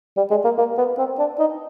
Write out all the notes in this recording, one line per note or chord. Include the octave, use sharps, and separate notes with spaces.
G3
G#3
A#3
A#3
B3
C4
D4
D#4